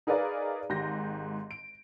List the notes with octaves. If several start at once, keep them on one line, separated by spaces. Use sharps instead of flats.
D#4 G#4 A#4 B4 D5 F5
G#1 G#2 G4 G6 A#6
D7